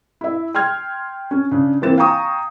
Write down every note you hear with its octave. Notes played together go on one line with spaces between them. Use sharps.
E4 E5
G5 C6 F6 G#6
C#4
C#3 D4
E3 A#3 C4 A6 E7
F5 G5 G#5 A#5 C#6 D#6